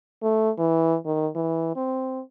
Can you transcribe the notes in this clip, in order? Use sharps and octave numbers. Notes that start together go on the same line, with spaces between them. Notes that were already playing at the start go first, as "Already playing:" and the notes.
A3
E3
D#3
E3
C4